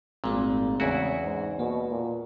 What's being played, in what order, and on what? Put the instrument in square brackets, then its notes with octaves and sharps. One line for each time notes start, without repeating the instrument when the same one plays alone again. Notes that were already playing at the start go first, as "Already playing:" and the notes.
[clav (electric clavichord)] G#1 A#2 [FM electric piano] G#3 A3 C4
[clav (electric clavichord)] E2 E4 F#4 [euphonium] C#3
[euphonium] G#2
[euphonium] B2 [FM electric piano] A#3
[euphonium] A#2